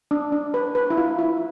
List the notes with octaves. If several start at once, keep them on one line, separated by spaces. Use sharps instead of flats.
D4
D4
B4
B4
E4
F4
E4